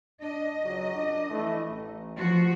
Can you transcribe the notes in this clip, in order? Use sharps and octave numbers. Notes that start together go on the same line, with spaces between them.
D4 D#5
C#2 F#3
F#2 D4
F2 E3 A3
A1
F3 F#4